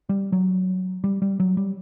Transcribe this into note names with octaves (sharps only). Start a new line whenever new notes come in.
G3
F#3
G3
G3
F#3
G3